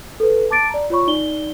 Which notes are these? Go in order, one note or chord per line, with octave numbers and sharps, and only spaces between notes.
A4 B4
A5 D6 A6 D7
D5 A#5
F4 C#5 B5 C#6
D#4 D5 G7